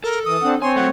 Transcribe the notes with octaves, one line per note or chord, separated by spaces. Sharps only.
A4 A#4
E3 D#6
C4 D4 F#5
C4 C#5 G#5 C6
F#3 A3 F#5